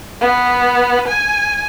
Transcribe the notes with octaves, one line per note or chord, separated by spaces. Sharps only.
B3
G#5